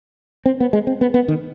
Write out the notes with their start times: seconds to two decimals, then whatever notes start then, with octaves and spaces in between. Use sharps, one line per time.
0.46 C4
0.60 B3
0.73 G#3
0.87 C4
1.01 B3
1.14 B3
1.28 D#3